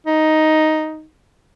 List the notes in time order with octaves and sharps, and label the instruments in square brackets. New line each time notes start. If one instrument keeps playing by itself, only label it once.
[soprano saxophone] D#4